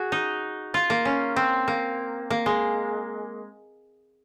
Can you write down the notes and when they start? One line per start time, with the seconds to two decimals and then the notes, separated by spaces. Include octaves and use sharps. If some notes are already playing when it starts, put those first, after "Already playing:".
Already playing: F#4 G#4
0.12 D#4
0.74 F4
0.90 A#3
1.05 C#4
1.36 C4
1.68 A#3
2.30 A#3
2.46 G#3